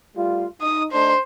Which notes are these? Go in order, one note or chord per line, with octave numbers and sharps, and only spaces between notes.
G3 A3 F4
D#4 D#6
A3 D4 D#4 C5